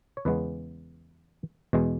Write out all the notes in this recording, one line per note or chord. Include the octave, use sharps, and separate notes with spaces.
C#5
E2 C#3 G#3 B3 B4
E2 B2 G#3